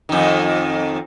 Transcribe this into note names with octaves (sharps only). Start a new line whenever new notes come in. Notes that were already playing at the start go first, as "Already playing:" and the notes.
F2 D#3